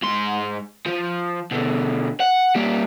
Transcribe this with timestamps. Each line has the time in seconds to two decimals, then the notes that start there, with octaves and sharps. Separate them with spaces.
0.02 G#2 C6
0.86 F3
1.52 B2 D3
2.20 F#5
2.55 G3 A#3